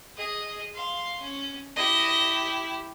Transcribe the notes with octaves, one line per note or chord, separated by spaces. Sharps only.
G#4 D#5
F5 C6
C#4
E4 G4 D#5